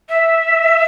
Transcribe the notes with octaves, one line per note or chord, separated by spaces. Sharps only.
E5